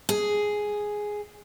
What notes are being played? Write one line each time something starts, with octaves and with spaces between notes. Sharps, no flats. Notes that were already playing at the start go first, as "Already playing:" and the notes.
G#4